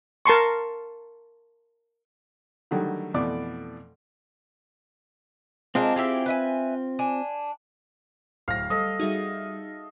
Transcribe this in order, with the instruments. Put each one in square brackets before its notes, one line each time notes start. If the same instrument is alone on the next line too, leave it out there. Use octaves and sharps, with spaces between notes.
[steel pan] A#4 A5 C6 C#6
[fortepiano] D3 D#3 F#3 G3 A3
F2 B2 E3 A3 D5 D6
[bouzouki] G#3 D4 A#4 [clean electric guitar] C4 F4
[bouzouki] E4 G4 G#4
B4 E5 G#5
D4 G#5
[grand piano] D1 A#6 [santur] F5
[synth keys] G3 [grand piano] A4 [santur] D#5
[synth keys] G3 F#4 [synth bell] D#4 G#4 E5